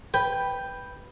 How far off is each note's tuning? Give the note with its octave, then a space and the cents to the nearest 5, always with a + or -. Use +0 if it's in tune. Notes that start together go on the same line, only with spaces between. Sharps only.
B4 +0 G5 +0